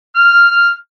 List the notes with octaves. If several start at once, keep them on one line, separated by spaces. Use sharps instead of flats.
F6